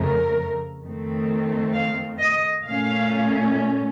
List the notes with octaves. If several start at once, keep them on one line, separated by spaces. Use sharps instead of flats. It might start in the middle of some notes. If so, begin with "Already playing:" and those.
Already playing: F2 C#3 A3 A#4
F2 D#3 A3 C4
F5
D#5
A#2 A3 C#4 F5